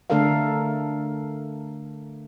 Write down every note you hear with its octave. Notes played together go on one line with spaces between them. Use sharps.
D3 A3 D4 A4 A#4 F5